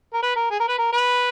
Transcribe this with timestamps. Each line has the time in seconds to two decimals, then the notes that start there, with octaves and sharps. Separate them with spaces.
0.13 A#4
0.22 B4
0.36 A#4
0.50 G#4
0.60 A#4
0.68 B4
0.78 A#4
0.92 B4